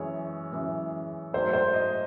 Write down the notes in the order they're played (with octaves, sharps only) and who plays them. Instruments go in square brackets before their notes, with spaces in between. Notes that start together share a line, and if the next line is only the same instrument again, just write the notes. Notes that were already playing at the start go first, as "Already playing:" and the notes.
Already playing: [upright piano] F#2 E3 G#3 C#5
F#2 E3 G#3
G#2 F#3 A3 C5
C5
D#5